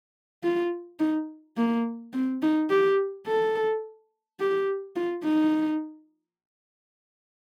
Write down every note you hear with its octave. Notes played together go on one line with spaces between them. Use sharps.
F4
D#4
A#3
C4
D#4
G4
A4
G4
F4
D#4